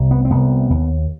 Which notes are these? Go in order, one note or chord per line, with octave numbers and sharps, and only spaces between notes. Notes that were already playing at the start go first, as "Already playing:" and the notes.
Already playing: C2 C3
B3
C4
C2 C3 B3
D#2